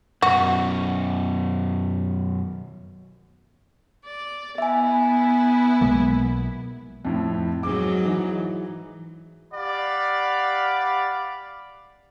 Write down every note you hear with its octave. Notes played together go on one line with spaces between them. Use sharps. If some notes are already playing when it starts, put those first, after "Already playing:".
F#2 B2 F#4
D5
B3 E4 E5 G#5
B1 G#3 A#3
F2 A2 E4
G#2 F#3 D6
E3 D#4 G#4
G4 D5 F5 F#5 B5